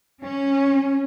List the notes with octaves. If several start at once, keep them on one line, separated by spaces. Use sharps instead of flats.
C#4